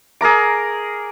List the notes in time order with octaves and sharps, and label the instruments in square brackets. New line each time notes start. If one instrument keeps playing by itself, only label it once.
[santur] G#4 A#4 A#5 D6